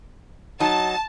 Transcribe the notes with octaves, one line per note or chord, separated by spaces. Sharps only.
F#3 D#4 A5